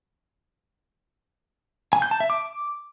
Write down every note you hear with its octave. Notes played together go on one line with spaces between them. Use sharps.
G#5
G6
A5
E5
D6